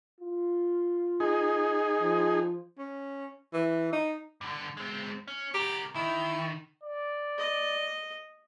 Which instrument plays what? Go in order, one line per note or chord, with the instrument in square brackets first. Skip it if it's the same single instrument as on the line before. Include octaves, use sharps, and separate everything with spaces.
[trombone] F4
[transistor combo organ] D#4 G#4
[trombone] F3
[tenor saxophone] C#4
E3
D#4
[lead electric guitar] G2 D3
G#3 C4
C#4
[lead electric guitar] C#3 A#4 [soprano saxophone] G4
[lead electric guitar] D#3 [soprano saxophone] E4
[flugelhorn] D5
[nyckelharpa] D#5